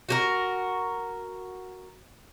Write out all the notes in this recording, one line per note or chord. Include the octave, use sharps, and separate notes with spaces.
F#4 G4 A#4